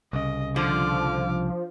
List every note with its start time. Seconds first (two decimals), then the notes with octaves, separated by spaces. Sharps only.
0.13 C2 C#3 D#5
0.56 D3 F3 D6 F6